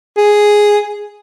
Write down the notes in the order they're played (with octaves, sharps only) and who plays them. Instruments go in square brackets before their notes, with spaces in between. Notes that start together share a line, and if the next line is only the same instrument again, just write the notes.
[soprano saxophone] G#4